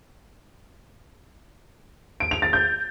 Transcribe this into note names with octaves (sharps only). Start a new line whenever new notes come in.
D7
F7
A6
G6